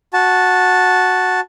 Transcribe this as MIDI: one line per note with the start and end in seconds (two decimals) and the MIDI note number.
0.13 1.40 66
0.13 1.40 81